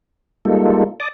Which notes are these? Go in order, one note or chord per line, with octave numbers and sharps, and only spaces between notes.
G3 G#3 A#3 D#4 F4 A4
D5 A5 D6 D#6